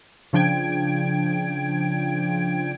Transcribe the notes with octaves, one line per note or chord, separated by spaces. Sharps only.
C#3 F3 D4 G5 G#6 D7